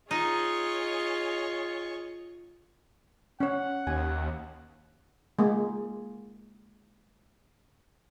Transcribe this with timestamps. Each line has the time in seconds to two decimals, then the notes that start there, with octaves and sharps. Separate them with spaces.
0.11 D#4 F4 G#4 C#5 D#5 C#6
3.40 C#4 C#5 F#5
3.87 D#2 G#5
5.39 G#3 A#3